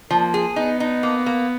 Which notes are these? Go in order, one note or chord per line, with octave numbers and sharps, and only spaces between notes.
F3 A#3
G#4
B3 D#4
D#4
A#3
A#3